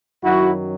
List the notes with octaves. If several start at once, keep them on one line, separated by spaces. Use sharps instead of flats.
F#2 D#3 F#3 E4 F#4